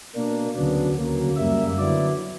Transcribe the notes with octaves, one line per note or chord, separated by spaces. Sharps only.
B2 A#3 D4
D2 C#3 F#3 B3 D4
D2 C#3 F#3 A#3
F#2 C#3 G3 A#3 E5
D3 F#3 B3 E4 D5